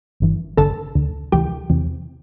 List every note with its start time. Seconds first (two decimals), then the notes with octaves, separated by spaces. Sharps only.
0.20 G1 G2 E3
0.57 A1 G2 D3 A4 A5
0.95 D2 D3
1.32 D2 C3 E3 G4 G5
1.70 E2 C3 E3